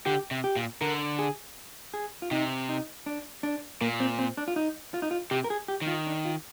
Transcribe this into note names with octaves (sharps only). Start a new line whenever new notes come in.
D3 G4
C3
G4
A#2
D3 A#4
G#4
G#4
F4
C3 D#4
D#4
D4
D4
A#2 A#3
C4
C4
D4
F4
D#4
F4
D#4
F4
C3 G4
A#4
G#4
G4
D#3
F4
D4
F4